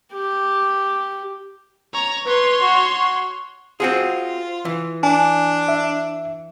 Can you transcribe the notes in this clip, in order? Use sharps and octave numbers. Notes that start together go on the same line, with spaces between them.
G4
C#5 A#5
B4 C#5 C6
F#4
F#4
C4 F4 F#4 G#4
E3
D4 G#5
E5